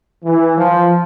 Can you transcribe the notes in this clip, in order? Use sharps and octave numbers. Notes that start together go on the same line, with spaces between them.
E3
F3